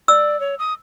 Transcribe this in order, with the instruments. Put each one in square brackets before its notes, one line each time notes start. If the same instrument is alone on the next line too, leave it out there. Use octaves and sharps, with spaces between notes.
[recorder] D5 [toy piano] E6
[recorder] C#5
D#6